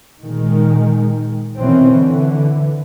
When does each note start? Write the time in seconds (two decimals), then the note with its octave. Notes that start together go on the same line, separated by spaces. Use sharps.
0.21 A#2 D#3 G#3
1.59 B2 D#3 E3 C4 C#4
1.90 D3 E3